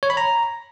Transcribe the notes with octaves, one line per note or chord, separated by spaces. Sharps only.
C#5
B5
A#5